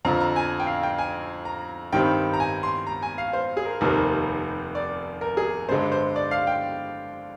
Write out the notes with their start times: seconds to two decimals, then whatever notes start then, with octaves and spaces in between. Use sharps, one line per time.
0.05 F2 D3 F3 A#5
0.20 A#5
0.36 G#5
0.60 G5
0.67 F5
0.83 G5
0.98 G#5
1.45 A#5
1.93 G2 D#3 G3 C4 G5
2.34 A#5
2.40 G#5
2.63 C6
2.87 A#5
3.02 G#5
3.18 F5
3.33 C5
3.57 G#4
3.65 A#4
3.81 F1 D#2 D#3 G3 C4 A#4
4.75 D5
5.21 A#4
5.37 G#4
5.69 G2 D3 G#3 C5
5.92 C5
6.16 D5
6.31 F5
6.47 G5